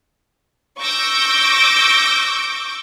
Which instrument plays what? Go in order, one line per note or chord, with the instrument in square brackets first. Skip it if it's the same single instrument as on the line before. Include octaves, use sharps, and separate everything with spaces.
[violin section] C#6 D6 E6 G6 A#6 D7